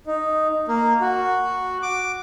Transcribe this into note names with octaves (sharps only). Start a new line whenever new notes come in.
D#4
A#3
F#4
D6